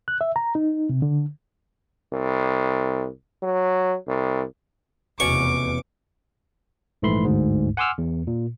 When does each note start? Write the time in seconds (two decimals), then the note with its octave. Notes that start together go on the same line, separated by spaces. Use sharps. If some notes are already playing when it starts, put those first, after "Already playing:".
0.08 F#6
0.21 E5
0.36 A#5
0.55 D#4
0.89 C3
1.02 D3
2.13 C2
3.43 F#3
4.07 C2
5.20 F1 E2 B2 C#4 C#6 D6
7.02 A#1 G#2 E3 A3 B5 C6
7.25 G1 D2 G#2
7.77 F#5 G#5 C6 D6 E6 F6
7.98 E2
8.27 A#2